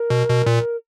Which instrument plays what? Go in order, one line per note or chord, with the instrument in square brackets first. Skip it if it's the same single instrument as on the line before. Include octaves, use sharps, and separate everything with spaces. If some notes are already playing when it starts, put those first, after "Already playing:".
Already playing: [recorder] A#4
[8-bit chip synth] B2
B2
A#2